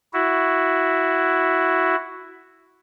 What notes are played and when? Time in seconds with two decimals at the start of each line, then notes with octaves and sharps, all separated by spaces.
0.13 E4 F#4